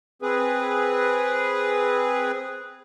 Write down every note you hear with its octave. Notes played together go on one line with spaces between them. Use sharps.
C4 G#4 B4